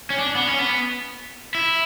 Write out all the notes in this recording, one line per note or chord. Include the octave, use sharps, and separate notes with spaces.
C#4
D4
B3
C#4
B3
E4